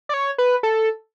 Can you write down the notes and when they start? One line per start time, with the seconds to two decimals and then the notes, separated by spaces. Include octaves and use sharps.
0.09 D5
0.14 C#5
0.38 B4
0.63 A4